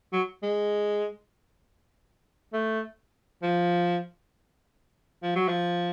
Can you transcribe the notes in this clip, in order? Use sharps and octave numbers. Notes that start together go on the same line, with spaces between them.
F#3
G#3
A3
F3
F3
F#3
F3